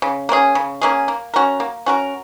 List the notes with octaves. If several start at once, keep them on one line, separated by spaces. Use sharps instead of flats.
C#3
A#3 C#4 G#4
C#3
A#3 C#4 G#4
A#3
C#4 F#4 A#4
A#3
C#4 F#4 A#4